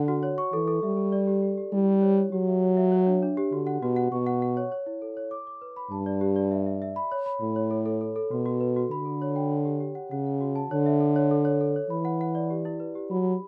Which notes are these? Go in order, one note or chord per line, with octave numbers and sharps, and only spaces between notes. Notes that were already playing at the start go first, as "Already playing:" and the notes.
Already playing: D3 F#5
F#4
C#5
C#6
E3 A4
A4
G3 E5
A4
D5
G4
G4
G4
G3 E4
G4
C#5
C#5
F#3 G4
E5
C#5
E5
C#5
D4
D4
G4
D3 F#4
F#5
B2 F#4
F#5
B2 C#6
F#5
F#5
C#5
C#5
E4
A4
C#5
D6
D6
B4
B5
G2 A5
D5
G4
D5
E5
E5
E5
B5
C#5
B5
A2 B5
C#5
A4
A4
A4
A4
B2 F#4
F#4
B4
F#4
D3 B5
A4
C#5
G5
C#5
G4
G4
F#5
C#3 F#5
F#5
F#4
A5
D3 C#5
E5
A4
C#5
A4
C#5
A4
C#5
E3 B5
F#5
F#5
D5
G4
E4
B4
G4
F#3 B5
B5